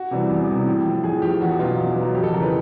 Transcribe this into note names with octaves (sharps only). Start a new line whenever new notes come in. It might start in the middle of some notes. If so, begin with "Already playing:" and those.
Already playing: F#4
C3 E3 G3
E2
C3 E3 G3
A2
F3
A2 G#4
F3 G4
E2 F#4
B2 F#3 F4
E2
B2 F#3
F2 G4
A4
C#3 E3 A#4
B4